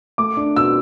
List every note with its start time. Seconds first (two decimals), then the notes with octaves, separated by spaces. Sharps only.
0.18 A3 D6
0.37 D4
0.56 B2 E6